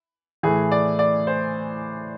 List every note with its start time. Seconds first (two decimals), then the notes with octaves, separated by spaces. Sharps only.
0.43 A2 E3 A3 G#4
0.72 D5
0.99 D5
1.27 C5